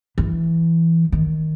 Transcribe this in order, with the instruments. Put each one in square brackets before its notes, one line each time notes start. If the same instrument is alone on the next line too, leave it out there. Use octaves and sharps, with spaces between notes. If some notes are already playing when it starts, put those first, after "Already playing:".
[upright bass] E3
D#3